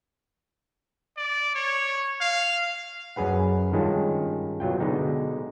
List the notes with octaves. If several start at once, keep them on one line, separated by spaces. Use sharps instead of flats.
D5
C#5
F5
F#2 C#4 G#4 B4 F#5
G2 D#3 G#3 C#4 F4 A5
B2 F#3 F4 G5
B2 D3 G#3 D#4